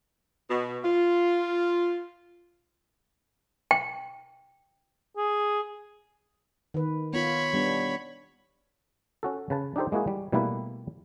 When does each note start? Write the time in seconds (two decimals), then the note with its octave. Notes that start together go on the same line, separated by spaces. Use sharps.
0.50 B2
0.85 F4
3.71 G5
5.17 G#4
6.74 D#3 B4
7.13 B3 F4 C#5 B5
7.54 G3 B3 D4
9.23 C#4 F#4 A4
9.50 C#3 B4 A5
9.76 D4 D#4 G4 A4 C5
9.92 G#3 A#3 E4 F#4 G#4
10.08 G3
10.32 B2 G3 A3 A#3 E4 B4